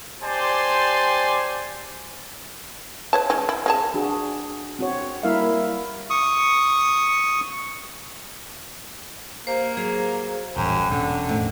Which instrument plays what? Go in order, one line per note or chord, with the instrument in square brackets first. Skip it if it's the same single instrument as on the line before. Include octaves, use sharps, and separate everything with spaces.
[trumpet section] G4 C5 D5 G#5 A5 C6
[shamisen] B4 C#5 A5
E3 G#3 C#4
E4
C4 G#4 A5
[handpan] D4 F#4 G#4
C4 F#4 C#5
G3 A#3 E4 A#4 E5 F5
[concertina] C#6 D#6
[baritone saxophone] A#3 [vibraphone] G4 C5
[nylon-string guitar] F#3 [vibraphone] G#4 C5
[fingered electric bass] D#1 A1 G3 [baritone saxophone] F#2 [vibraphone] G5
[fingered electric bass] E1 A#2 C#4 [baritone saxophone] D3
[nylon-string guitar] F2 A2 D#3